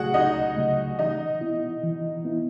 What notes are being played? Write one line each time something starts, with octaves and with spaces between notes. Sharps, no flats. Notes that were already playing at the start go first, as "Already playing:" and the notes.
Already playing: C#2 C#3 F#3 A3 F#4 G#4 F#5
C#2 D#4 D#5
C#3 F#3 A3
E3 D#4 D#5
B3 E4
E3
B3 E4